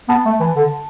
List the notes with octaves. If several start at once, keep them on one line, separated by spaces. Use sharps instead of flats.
B3 A5
A3
E3
D3